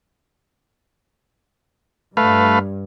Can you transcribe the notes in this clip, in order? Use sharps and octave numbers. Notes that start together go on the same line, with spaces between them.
G2 A3 B4 F5